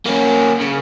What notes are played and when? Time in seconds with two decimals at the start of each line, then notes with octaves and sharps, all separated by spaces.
0.06 A#3 C#4
0.61 C#3